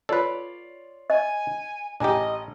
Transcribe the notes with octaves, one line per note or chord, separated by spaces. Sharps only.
F4 A4 B4 C#5 D5
D#5 G#5
A1 D4 G4 D#5 G#5 A#5